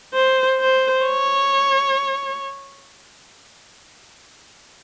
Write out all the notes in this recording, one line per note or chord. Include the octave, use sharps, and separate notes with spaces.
C5
C5
C#5